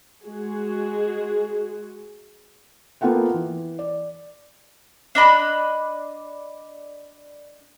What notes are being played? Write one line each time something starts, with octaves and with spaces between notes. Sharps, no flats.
G#3 F#4 G#4
A#3 B3 F4 A4 F#5 G5
E3
D5
D4 D#5 B5 F#6